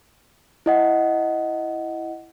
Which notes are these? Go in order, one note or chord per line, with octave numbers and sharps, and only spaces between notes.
E4 D#5 F#5